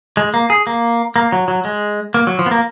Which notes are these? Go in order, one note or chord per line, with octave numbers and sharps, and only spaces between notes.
G#3
A#3
G#4
A#3
A#3
F#3
F#3
G#3
A#3
F#3
F3
B3
A#3